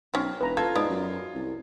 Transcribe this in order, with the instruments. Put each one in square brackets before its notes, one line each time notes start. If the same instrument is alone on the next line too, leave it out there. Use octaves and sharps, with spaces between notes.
[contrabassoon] B1 [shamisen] C4 C#4
[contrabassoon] E1 [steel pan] B4 A#5
[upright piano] F4 G#6 [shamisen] A4
[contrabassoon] G#2 [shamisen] B3 D5
[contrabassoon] F#2
C2